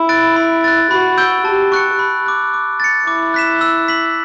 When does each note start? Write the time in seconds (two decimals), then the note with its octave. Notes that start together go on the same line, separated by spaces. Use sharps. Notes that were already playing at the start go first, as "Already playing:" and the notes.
Already playing: E4
0.09 F#6 A6 D7
0.36 B5
0.64 F#6 A6
0.90 F#4 B5
1.18 E6 G6 D7 G7
1.45 G4 A5
1.72 C#6 F#6 C#7
1.99 B5
2.26 D6 F#6
2.54 D6
2.80 A6 C#7
3.07 E4 D6
3.34 F#6 B6 E7
3.61 E6
3.88 B6 F#7